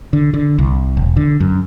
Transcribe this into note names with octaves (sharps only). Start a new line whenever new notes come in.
D3
D3
C2
E1
D3
F#2